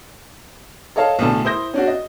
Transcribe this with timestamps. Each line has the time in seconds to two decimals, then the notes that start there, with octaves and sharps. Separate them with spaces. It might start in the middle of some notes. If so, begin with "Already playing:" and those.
0.96 A4 C#5 D#5 F5 A5
1.19 B1 A2 D3 A5
1.45 E4 C5 D#6 G6 A#6
1.74 C#4 D4 F#4
1.88 D#5